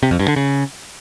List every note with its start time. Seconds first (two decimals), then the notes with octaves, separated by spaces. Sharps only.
0.03 C3
0.11 F2
0.19 G2
0.28 D3
0.36 C#3